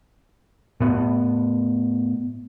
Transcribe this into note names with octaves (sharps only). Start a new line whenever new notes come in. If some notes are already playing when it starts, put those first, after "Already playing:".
A2 B3